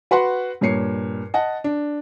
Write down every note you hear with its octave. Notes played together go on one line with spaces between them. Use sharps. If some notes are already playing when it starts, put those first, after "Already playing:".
F#4 B4 F#5 C6
G2 A#2 C#5 C7 C#7
D#5 F#5 A5
D4